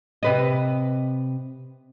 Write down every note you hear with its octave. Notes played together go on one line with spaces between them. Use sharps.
C3 B4 D#5